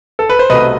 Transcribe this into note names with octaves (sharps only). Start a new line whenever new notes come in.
A4
B4
C5
C2 B2 A3 B4 D#5